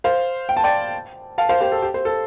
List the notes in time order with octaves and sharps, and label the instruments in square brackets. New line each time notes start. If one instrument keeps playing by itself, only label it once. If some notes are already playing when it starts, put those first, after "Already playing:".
[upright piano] C5 F5
G5
A5
D5 G5
F5 A5
C5 F5
G4 C5
A4
G4
C5
A4